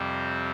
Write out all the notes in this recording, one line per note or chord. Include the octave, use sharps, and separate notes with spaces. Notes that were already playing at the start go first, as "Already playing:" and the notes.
Already playing: F2 C3 G3 C4